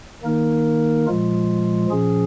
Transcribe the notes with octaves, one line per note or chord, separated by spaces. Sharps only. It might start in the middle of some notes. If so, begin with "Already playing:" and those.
D#3 A#3 D#4 A#4
A#2 F3 G#3 F4
A#2 F3 C#4 G#4